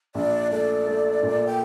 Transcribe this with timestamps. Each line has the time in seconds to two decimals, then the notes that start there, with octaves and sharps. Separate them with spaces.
0.15 A#1 D5
0.51 A3 D5
0.87 A3
1.23 A#2
1.47 G5